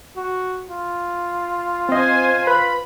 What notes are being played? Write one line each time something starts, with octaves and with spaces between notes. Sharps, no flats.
F#4
F4
C4 C5 D#5 G#5
B4 B5